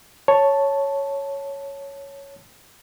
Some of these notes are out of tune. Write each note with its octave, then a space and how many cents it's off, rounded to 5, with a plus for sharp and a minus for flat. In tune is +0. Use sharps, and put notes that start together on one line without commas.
C#5 +0 A5 +0